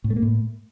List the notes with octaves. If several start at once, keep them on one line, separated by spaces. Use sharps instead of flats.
A2
A3
A#3
A2